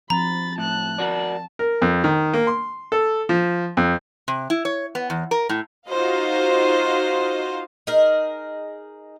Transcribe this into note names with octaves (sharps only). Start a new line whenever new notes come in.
F3 C4 A#5 B5 A6
A2 A5 F#6
F#4 A#4 D5 A5
A#4
F2
D#3
A#3
C6
A4
F3
F2
C3
E4
C#5
B3
E2
A#4
A2
D#4 F4 F#4 C5 D#5 F5
D#4 G#4 A#4